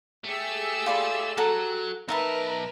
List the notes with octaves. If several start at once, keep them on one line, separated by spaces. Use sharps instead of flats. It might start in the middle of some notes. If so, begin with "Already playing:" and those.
A3 G4 G#4 E6
F4 D5 B5
F#3 A4 F#5 A#5
B1 D#4 A#4 B4 E5 A5 B5